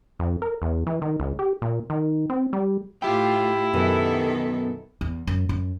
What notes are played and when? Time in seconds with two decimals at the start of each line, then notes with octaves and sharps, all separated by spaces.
0.19 F2
0.42 A#4
0.62 E2
0.87 E3
1.02 D#3
1.20 C#2
1.39 G4
1.62 A#2
1.90 D#3
2.30 C4
2.53 G3
3.02 A2 E4 F4 G4 G5
3.74 F#2 B2 D#3 B3 A4
5.01 E2
5.27 F#2
5.49 F#2